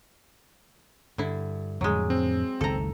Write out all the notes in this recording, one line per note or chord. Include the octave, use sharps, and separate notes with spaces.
G2 D3 E4
F2 A2 D3 F#3 G#3
C4
F#1 C#2 D#3 A4 A#5